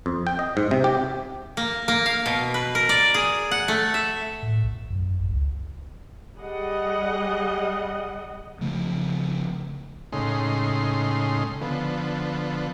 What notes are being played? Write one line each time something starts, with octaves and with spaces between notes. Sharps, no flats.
F2
G5
D#5
G#2
C3
G4
A#3
A#3
F5
B2
B4
A#4
D5
G#4
F#5
A3
E5
A2
A#1
F#2
A1
C#2
G3 G#4 D#5 F#5
C#3 F3 A3
A2 C#3 G#3 D#4 C6
D3 F3 B3